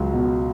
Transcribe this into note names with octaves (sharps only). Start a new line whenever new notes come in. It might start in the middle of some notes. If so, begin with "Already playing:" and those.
Already playing: C#2 F#3
B2